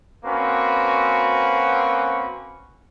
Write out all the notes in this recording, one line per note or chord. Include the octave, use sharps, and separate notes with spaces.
A#3 C4 C#4 F#4 B4